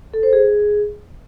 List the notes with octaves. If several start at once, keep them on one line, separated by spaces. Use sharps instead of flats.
A4
C5
G#4